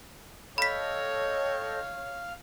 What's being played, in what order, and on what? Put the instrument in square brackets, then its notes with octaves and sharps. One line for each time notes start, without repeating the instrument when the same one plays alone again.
[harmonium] A4 D#5 G5 [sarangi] C#5 [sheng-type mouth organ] F5 [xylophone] B5 B6